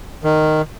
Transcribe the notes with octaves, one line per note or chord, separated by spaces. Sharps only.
D#3